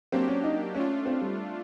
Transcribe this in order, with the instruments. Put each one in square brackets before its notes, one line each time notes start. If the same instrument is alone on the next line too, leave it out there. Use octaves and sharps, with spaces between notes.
[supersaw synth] F#3 A#3 D4 G4 [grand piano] C4
[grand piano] C#4
D#4
[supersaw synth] A3 D4 F4 [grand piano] C#4
[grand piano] C4
G3